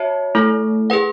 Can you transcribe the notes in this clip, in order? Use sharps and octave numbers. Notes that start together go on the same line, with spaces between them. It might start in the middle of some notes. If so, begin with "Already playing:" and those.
Already playing: F#4 C#5 E5 A5
A3 E4 A4
G#4 B4 F#5